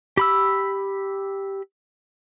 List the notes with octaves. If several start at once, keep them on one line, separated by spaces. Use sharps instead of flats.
G4 B5 E6